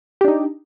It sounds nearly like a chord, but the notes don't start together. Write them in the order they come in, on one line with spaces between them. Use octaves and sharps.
G4 D4 D#4